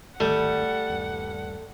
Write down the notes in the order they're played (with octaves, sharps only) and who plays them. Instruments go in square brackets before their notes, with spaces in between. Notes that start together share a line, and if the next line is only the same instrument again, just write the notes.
[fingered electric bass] D1 G#1 D#3 [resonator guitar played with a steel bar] G3 [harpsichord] A3 [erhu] F#5
[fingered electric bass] D#1 G2